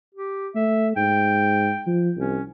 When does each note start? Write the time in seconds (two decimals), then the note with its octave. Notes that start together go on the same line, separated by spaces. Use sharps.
0.14 G4
0.55 A3 E5
0.96 G#2 G5
1.87 F3
2.17 C2 C#4